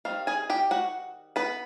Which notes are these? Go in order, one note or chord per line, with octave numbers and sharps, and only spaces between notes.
D#3 G3 C4 F5
G#4 G#5
G4 G5
F#4 F#5
B3 B4